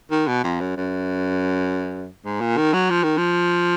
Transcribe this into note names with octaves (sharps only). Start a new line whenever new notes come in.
D#3
B2
F2
F#2
F#2
G#2
A#2
D#3
F#3
F3
D#3
F3